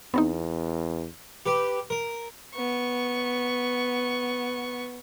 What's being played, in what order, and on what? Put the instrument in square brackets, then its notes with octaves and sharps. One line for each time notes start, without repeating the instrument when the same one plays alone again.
[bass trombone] E2 [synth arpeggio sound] B3 C4 D#4
[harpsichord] G4 B4
A#4
[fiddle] B3 C#6